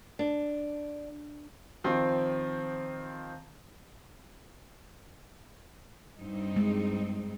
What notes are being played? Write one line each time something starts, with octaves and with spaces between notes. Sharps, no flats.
D4
D#3 F3 C4
G2 C4 D#4
G#3